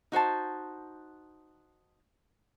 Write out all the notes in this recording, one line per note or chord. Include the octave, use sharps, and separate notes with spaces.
D#4 F#4 C5 A5